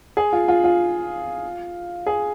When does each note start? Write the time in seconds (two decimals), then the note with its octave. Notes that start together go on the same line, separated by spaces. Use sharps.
0.17 G#4
0.33 F4
0.48 F4
0.64 F4
2.07 G#4